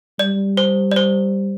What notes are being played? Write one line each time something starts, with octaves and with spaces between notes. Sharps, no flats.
G3 D5
C5
D5
C5